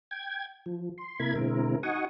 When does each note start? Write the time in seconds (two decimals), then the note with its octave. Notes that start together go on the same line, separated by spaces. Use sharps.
0.11 G5 G#6
0.66 F3
0.98 C6
1.20 C3 A#3 E4 A#4 B5 G#6
1.36 B2 D3 G#3 C4 E4 A#4
1.83 D#4 F#4 F#5 G#5 C#6 D#6